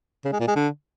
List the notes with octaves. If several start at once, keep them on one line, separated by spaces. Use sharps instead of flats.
C#3
G#3
A#2
G#3
D3